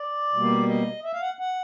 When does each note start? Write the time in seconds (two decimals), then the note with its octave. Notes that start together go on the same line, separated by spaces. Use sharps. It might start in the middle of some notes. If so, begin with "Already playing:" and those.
Already playing: D5
0.33 B2 G3 A#3
0.68 D#5
1.04 E5
1.13 F5
1.22 F#5
1.39 F#5